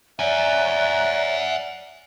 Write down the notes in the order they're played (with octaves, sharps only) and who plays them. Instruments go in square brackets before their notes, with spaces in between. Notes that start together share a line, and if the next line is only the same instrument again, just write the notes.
[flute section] C#5 A#5 F#6 [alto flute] D5 [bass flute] E5 [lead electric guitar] F#5 G#5